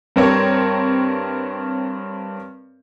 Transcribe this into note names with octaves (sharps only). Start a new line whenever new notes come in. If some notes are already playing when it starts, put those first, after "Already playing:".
G2 C4 A#4 C#5